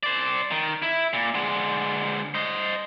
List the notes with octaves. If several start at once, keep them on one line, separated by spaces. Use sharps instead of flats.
C5 D5
D#3
E4
A#2
D3 G#3
C5 D#5